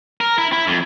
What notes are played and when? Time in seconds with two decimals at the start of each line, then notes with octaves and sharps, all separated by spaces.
0.21 A#4
0.38 E4
0.52 E4
0.67 F2